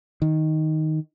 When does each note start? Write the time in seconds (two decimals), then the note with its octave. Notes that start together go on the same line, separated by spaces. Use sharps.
0.22 D#3